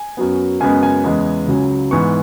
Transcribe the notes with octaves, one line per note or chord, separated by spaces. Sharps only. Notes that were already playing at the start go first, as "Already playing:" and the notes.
Already playing: G#5
F#2 F#3 B3
F#2 C#3 G#3 B3 G#5
G#5
E2 C#3 G#3 B3
C#2 C#3 F#3
G#2 E3 B3 C#6